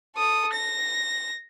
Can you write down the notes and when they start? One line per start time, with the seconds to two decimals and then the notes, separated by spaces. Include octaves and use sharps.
0.16 A4 D#6
0.53 A#6